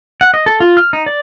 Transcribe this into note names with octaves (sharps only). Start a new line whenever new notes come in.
F#5
D#5
A4
F4
F6
D#4
D5